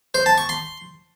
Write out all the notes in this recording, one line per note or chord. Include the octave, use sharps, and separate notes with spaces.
C5
A5
C#6
C6